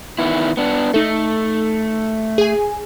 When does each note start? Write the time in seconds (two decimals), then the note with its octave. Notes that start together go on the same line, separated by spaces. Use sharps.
0.19 D#3 B3 E4
0.57 B3 D4
0.94 A3 D#4 A4
2.38 G#4 G#5